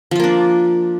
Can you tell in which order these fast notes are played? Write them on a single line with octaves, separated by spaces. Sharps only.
F3 F4 A#3 D4